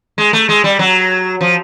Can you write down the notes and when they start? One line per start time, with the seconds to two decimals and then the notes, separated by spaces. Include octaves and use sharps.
0.18 G#3
0.33 A3
0.49 G#3
0.64 G3
0.79 F#3
1.41 F3